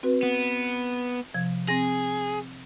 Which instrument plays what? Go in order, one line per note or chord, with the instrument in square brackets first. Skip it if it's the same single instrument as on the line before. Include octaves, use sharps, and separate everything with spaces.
[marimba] C4 F#4 B4
[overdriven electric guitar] B3
[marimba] C3 F3 G#6
[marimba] C4 A#6 [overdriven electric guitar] G#4